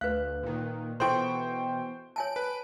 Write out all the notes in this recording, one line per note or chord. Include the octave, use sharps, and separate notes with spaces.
D2 B4 F5 F#6
A#2 D#3
B2 E3 E4 A4 C5 G5 C6 C#6
C#5 G#5 A5 D7
B4